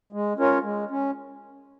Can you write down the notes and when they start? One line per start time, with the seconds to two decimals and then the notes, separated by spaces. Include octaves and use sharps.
0.12 G#3
0.38 C#4 F4 A#4 C#5
0.64 G#3
0.90 C#4